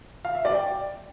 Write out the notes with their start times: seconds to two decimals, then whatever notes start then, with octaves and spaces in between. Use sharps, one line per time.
0.25 F5
0.35 E5
0.45 D5
0.55 G5